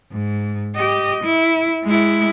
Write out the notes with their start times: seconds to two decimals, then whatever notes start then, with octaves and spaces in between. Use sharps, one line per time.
0.11 G#2
0.76 G4 D#5
1.24 E4
1.84 G#3 E4